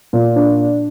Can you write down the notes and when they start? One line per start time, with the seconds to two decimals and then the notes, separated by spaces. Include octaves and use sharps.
0.13 A#2
0.36 D4